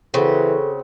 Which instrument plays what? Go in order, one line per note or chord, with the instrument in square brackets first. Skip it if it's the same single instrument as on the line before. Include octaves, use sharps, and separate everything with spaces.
[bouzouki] C#3 [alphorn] E3 [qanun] C4 F#4 [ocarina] A4